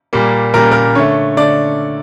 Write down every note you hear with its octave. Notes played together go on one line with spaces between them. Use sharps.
A#2 G3 A#3
A#2 G3 A#3 A#4
A#4
D3 A3 C#5
D3 A3 D5